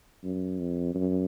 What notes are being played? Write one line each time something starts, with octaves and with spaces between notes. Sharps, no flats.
F#2
F2
F#2